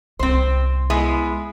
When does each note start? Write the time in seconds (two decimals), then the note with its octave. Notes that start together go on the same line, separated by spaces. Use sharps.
0.19 C2 C4 C5
0.90 G#3 B3 E4